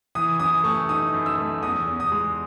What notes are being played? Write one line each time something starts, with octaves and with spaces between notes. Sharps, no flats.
E3 D#6
F#2 D#6
A3 C#6
D#4 D#6
F#2
E6
A3
E2 D#6
E2
D#6
G#3